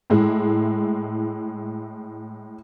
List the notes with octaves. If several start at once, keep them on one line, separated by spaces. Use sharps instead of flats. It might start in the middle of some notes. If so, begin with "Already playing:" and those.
A2 G#3 E4